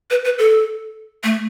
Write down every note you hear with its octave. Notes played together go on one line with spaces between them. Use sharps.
B4
B4
A4
A3